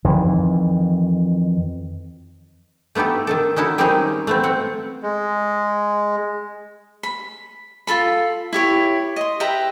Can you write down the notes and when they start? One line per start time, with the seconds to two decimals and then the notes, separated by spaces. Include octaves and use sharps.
0.04 F2 D#3 E3
2.95 A3 B3 D#4 G4 A4
3.27 D#3 D#4 A4
3.56 C#4 D#4 E4 F#4 A4
3.78 D#3 G3 G#3 C4 C#4 D#4
4.27 A3 B3 C4
4.44 C4 F#5
5.03 G#3
7.03 B5
7.87 F4 F#4 A4 B5
8.53 E4 G4 C#5
9.16 D#5 C6
9.40 G4 B4 E5 A#5